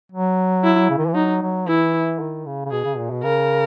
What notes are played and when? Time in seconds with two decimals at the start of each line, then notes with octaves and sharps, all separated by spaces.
0.12 F#3
0.64 E4
0.90 C#3
0.98 D#3
1.07 E3
1.15 F#3 D#4
1.42 F#3
1.68 E3 E4
2.20 D#3
2.46 C#3
2.65 C#3
2.71 B2 G#4
2.85 C#3
2.97 A#2
3.10 B2
3.23 C#3 A#4